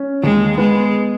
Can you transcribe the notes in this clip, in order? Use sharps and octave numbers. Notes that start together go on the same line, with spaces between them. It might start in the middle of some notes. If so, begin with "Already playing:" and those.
Already playing: C#4
D#2 G#3
G#3 B3